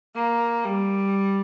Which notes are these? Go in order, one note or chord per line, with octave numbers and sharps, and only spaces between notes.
A#3
G3